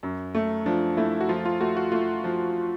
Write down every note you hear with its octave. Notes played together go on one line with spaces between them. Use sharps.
F#2
A3
F3 D4
A3 E4
F#4
F3 F4
F4
A3 F#4
F#4
A3 F4
F3